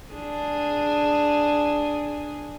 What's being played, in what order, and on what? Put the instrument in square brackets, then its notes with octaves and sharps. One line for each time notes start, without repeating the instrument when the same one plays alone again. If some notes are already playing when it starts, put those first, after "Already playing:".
[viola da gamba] D4 G#4